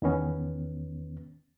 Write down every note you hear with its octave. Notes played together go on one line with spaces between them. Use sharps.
E2 D#3 B3 C#4